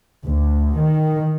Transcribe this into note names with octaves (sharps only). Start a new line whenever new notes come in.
D2
D#3